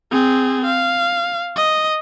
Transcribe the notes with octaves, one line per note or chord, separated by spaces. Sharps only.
C4 G#4
F5
D#5